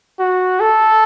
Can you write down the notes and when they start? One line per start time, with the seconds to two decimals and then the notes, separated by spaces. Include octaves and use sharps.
0.20 F#4
0.60 A4